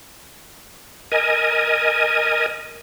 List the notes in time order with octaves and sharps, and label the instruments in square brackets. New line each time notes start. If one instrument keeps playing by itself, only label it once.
[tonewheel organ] A#4 D#5 G#5